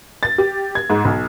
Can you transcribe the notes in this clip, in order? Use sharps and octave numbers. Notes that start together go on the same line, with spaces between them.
A6
G4
G#6
G#2
B1